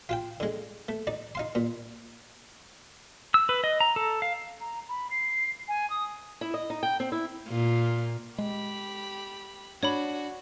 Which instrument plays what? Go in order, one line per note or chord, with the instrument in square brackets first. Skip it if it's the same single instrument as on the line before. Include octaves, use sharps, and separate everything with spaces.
[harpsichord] F4 F5 G5
D3 G#3
A3
D#4 D5
D#4 F5 C6
A#2
[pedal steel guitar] E6
B4
D#5
A#5
A4
F5
[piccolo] A#5
B5
C7
G#5
D#6
[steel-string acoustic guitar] E4
D#5
D#4
G5
C4
E4
[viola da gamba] A#2 F4
[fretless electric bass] G#3 [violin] G4 B5
[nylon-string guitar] D4 [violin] F#4 [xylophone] C#5 B5